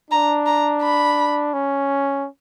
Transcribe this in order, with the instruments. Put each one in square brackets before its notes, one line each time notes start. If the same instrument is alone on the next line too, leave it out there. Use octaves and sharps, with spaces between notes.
[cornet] D4 [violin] A#5
[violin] A#5
B5
[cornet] C#4